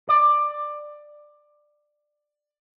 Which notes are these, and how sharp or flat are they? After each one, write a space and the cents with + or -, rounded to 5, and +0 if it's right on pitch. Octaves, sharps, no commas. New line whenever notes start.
D5 +15